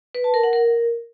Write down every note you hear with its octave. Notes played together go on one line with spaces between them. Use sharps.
B4
A5
A#4
F#5
A#4